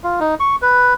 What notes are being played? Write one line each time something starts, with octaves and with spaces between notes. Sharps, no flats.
F4
D#4
C#6
B4